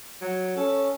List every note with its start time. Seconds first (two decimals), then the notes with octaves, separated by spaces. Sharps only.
0.21 F#3
0.57 C#4 A4